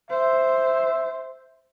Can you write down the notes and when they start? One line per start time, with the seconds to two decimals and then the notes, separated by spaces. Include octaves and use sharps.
0.11 C5 E5